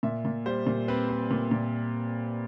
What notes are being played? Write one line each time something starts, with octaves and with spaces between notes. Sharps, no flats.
A#2 E5
A#2
G3 C5
A#2
C4 B4
C4
A#2
A#2